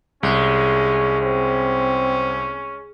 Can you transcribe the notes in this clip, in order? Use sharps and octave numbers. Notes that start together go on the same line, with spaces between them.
C2 G#3 C#4
C4 C#4